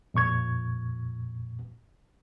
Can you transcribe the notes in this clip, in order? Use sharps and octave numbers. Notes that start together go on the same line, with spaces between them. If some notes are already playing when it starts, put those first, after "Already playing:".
F2 A#2 C#6 G#6